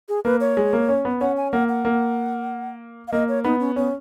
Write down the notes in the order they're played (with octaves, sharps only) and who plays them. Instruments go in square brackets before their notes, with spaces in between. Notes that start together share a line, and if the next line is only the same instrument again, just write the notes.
[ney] G#4
[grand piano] A#3 [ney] B4
[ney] C#5
[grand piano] G#3
A#3
C#4
B3
[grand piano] C#4 [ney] F#5
[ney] G#5
[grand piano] A#3 [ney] F#5
[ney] F#5
[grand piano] A#3
[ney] F5
[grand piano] A#3 [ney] D#5
[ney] C#5
[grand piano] B3 [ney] D#4
[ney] C#4
[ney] B3 [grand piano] C#4